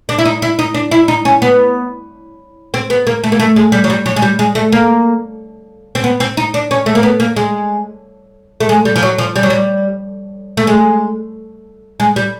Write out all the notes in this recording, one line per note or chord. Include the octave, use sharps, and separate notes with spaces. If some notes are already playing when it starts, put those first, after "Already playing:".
D4
E4
D#4
E4
D#4
D4
E4
D#4
C#4
B3
C4
B3
A#3
A3
A#3
A3
G#3
G3
F#3
G3
F#3
G#3
G3
G#3
A3
A#3
C4
B3
C4
D#4
D4
C#4
A3
A#3
B3
A#3
G#3
A3
G#3
G3
F3
F#3
F3
G3
F#3
G3
A3
G#3
G#3
G3